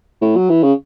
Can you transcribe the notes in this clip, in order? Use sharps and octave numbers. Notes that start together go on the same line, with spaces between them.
A2
F#3
E3
C#3